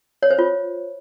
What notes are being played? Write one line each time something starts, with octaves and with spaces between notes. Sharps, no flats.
C#5
C5
F4